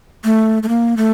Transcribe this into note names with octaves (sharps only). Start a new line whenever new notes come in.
A3
A3
A#3
A3